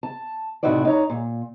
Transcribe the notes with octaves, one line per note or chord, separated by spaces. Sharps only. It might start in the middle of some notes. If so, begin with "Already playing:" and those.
A5
A2 C3 D#4 E4 F#4 D5
D#4 C#5 A#5
A#2